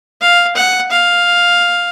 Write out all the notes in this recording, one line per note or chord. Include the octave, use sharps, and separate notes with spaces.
F5
F#5
F5